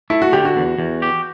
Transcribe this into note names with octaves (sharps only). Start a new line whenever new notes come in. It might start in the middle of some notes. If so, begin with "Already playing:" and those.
A3 E4
F#4
D3 G4
F#4
E2
E2
G4